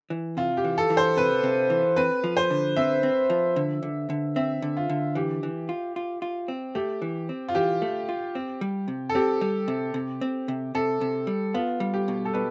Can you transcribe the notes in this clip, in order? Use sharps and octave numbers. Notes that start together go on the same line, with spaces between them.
E3
C3 F4
G4
E3
A4
E3
C5
C3 B4
C3
E3
C4 B4
F3
C5
D3
C4 E5
C4
F3
D3
D3
D3
C4 E5
D3
F4
D3
E3 G4
E3
F4
F4
F4
C4
A3 G4
E3
C4
F4
E3 G4
A3
F4
C4
G3
C3
A4
C4 G4
G3
C3
C3
C4
C3
C3 A4
C3
G3
B3 F4
G3
G4
B2
A4
B2 B4